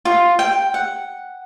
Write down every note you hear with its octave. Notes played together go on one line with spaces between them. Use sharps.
F4
G5
F#5